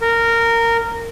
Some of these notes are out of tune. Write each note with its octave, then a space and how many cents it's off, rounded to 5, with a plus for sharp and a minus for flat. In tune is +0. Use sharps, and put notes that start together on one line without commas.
A#4 -15